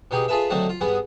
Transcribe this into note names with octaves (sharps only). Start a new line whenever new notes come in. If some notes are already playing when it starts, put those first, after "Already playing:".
B2 D#4 G4 G#4
F4 G#4 A4 B4 E5
D3 F#3 A3 C4 D#4
F4
G2 B3 G#4